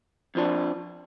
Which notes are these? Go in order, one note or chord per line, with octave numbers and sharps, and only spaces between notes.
F2 F3 D4